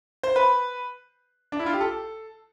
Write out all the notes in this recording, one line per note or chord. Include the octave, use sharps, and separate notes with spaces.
C5
B4
D4
E4
F4
G4
A4